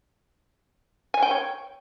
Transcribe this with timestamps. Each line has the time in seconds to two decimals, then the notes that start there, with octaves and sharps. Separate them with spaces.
1.14 G#5
1.23 G5
1.31 C#5